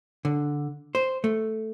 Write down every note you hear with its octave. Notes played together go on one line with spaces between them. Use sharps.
D3
C5
A3